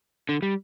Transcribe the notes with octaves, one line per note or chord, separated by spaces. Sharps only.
D3
G3